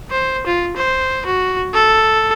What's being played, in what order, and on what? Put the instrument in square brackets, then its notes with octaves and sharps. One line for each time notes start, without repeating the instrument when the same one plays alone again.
[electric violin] C5
F4
C5
F#4
A4